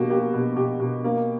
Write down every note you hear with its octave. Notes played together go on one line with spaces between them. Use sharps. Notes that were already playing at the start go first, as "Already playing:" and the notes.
Already playing: B2 A#3 F#4 G4
A#3 G4
B2
B2 G4
B2
A#3